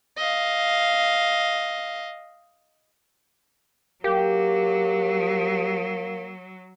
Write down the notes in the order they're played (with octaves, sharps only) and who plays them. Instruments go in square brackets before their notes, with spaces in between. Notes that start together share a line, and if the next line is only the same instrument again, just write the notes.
[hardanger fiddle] D#5 F5
[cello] F#3 [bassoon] A#3 [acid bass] G4